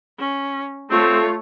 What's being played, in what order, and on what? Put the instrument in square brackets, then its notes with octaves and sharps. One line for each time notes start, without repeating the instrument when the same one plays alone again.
[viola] C#4
[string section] A3 [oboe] C4 [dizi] F4 [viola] C#5